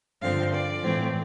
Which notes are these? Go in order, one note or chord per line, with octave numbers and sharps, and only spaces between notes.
G2 D3 F3 C4 F5
D5
A2 E3 A3 C4